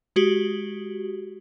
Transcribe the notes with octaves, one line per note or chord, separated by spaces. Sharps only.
G#3 F#4 G4